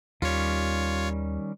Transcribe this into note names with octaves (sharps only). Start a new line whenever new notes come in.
D#2 D#3 G3 C#4 F4 C#5